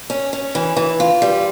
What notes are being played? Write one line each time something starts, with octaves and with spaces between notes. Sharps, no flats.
C#4
C#4
E3
E3
F4
G3